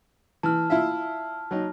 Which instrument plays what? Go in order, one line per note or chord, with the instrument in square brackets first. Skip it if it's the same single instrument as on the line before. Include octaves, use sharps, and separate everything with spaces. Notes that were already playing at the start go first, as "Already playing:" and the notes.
[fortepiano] E3 [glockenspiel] A5 F6
[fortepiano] E4 F4 E5
F#3 D#4